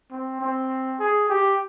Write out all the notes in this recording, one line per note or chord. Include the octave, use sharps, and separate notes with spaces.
C4
C4
G#4
G4